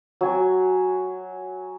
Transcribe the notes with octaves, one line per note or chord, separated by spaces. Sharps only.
F#3 G#5